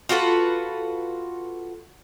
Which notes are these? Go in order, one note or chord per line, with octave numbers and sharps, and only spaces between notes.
F4 F#4 A4 B4